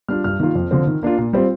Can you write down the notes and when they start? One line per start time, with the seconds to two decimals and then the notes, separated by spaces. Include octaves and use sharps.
0.08 G3 D4 F4 F6
0.24 G2 F6
0.40 D#3 A#3 F4
0.55 F2
0.71 D3 F3 C4
0.87 D#3
1.03 A#3 D4 F4
1.18 A#2
1.33 G3 C4 F4